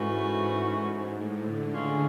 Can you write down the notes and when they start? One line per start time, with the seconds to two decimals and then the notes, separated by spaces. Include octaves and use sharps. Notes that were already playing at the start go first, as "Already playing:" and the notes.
Already playing: G#2 E3 A3 C#4 F#4
1.17 A2
1.44 D3
1.73 D3 E3 G#3 C#4 F4 G#4